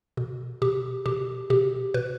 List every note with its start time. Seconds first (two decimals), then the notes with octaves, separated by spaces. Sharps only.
0.17 B2
0.62 B2 G4
1.06 B2 G4
1.50 B2 G4
1.94 B2 B4